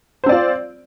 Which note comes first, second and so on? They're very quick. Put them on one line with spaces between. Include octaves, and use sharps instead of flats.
C5 C4 D5 F4